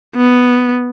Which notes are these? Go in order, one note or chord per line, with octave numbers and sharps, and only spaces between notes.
B3